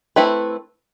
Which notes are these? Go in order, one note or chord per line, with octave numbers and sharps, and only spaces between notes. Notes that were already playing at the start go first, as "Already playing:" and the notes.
A3 C4 E4 B4